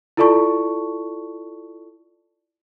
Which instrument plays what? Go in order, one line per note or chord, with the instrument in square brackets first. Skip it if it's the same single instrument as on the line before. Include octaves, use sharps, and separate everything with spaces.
[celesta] E4 F4 A4 D5 A5 C#6